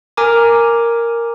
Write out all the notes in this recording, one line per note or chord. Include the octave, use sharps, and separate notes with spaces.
A#4 G#5 A#5 D6